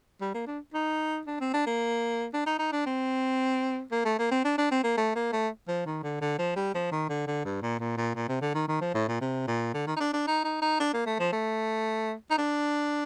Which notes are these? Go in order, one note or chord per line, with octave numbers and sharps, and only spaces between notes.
G3
A#3
D4
D#4
D4
C4
D4
A#3
D4
D#4
D#4
D4
C4
A#3
A3
A#3
C4
D4
D4
C4
A#3
A3
A#3
A3
F3
D#3
D3
D3
F3
G3
F3
D#3
D3
D3
G2
A#2
A#2
A#2
A#2
C3
D3
D#3
D#3
F3
A2
A#2
C3
A#2
D3
D#3
D#4
D4
D4
D#4
D#4
D#4
D4
A#3
A3
F3
A3
D#4
D4